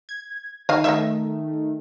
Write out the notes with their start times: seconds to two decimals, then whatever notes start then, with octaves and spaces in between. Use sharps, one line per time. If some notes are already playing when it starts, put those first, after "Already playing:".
0.09 G#6
0.69 D#3 D#5 F5
0.84 D#3 A3 D#5 E5